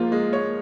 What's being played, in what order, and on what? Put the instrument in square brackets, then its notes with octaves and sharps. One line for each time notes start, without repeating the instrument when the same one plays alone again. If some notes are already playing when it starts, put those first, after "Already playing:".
Already playing: [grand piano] F3 G#3 F4 [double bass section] A#3
[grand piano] G#3
C#5